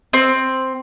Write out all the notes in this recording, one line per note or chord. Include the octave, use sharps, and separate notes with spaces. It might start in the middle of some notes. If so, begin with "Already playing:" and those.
C4